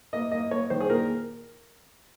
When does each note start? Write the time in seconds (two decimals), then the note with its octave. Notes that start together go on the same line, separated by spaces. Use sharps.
0.13 A#3 D#5
0.31 A#3 D#5
0.51 A#3 C#5
0.70 D#3 C5
0.81 G#4
0.89 A#2 A#4